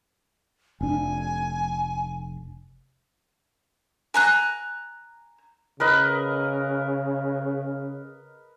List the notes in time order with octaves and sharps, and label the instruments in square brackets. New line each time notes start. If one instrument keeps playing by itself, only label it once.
[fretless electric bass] F1 D4 [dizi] G#5
[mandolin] G#5 A#5 F#6
[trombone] C#3 [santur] A#4 B4 D#5